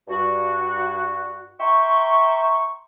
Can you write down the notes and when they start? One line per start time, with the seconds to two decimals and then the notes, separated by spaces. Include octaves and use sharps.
0.08 G2 F#4
1.60 E5 G5 A#5 C6 C#6